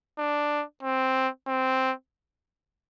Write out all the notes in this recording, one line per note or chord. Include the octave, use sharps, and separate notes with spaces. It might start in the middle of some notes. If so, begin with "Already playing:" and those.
D4
C4
C4